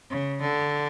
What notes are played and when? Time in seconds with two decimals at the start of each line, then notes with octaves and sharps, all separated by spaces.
0.10 C#3
0.41 D3